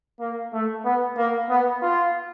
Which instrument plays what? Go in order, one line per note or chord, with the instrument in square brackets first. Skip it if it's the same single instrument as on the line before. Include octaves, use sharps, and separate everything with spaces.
[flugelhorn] A#3
A3
B3
A#3
B3
F4